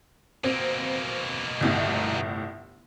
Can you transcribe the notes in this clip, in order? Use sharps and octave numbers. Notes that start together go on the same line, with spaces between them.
B2 A#3 C4
G1 C2 A2